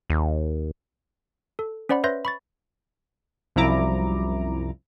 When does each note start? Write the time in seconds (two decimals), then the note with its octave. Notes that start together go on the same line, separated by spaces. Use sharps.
0.10 D#2
1.59 A4
1.89 C#4 C5 D5 F#5 B5
2.04 B4 C#5 E5 C6 G6 A#6
2.25 B5 C#6 A6
3.56 C2 F#2 F3 E4 A#5 D6